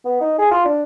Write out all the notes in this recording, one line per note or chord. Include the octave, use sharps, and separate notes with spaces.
B3
D#4
G#4
F4
D4